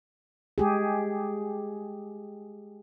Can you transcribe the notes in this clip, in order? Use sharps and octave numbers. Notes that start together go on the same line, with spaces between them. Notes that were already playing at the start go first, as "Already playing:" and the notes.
G#3 G4 G#4